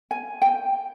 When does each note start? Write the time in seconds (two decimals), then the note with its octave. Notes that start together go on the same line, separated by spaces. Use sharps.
0.11 G#5
0.42 G5